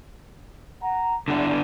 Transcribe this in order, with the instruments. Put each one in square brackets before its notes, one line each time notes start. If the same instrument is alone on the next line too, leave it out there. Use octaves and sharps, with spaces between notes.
[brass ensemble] F#5 A#5
[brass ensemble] E2 [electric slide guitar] D3 B3 D4